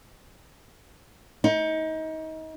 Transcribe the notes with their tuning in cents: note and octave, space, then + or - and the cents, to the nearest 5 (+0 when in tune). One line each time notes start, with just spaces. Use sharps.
D#4 +30